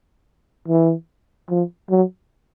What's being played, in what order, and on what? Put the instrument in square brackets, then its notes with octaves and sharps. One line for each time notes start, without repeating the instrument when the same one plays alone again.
[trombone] E3
F3
F#3